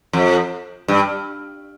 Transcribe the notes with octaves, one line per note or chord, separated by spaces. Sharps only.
F2
G2